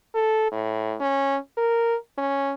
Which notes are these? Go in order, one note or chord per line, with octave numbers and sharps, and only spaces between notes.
A4
A2
C#4
A#4
C#4